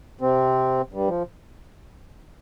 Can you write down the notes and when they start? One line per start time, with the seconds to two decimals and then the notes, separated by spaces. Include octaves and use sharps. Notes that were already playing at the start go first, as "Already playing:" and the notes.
0.21 C3 C4
0.93 G2 G3
1.08 F3